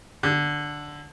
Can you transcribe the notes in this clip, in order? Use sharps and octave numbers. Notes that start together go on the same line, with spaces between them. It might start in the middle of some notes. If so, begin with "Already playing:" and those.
D3